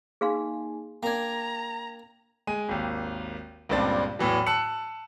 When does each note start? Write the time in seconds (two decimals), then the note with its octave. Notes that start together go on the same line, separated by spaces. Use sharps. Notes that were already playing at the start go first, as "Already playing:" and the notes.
0.21 A#3 D#4 G#4 F5 G#5 C6
1.03 A#3 D4 G5 A#5 G#6
2.47 G#3 G#5 D#7
2.69 G#1 D#2
3.69 C#2 G2 A#2 C4 D4 A6
4.19 E2 A2 E3 F#3
4.46 A5 E6 F#6 C#7 F#7